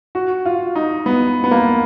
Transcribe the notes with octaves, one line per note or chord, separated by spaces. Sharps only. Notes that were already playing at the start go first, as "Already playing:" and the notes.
F#4
F4
D#4
B3
B3
A#3